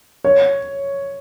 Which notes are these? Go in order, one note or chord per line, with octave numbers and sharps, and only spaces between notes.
C#5